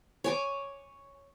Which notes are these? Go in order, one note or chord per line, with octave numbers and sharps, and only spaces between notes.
C#5 G#5 D6